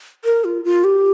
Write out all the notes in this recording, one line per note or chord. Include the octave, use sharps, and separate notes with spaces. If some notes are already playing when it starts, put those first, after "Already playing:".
A#4
F4
F4
G4